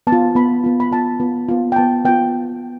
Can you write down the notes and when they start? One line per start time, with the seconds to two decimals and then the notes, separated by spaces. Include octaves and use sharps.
0.07 B3 A5
0.12 F4
0.35 B3 F4 B5
0.64 B3 F4
0.80 B5
0.91 B3 F4 A5
1.20 B3 F4
1.48 B3 F4
1.72 G5
1.76 B3 F4 A5
2.05 B3 F4 G5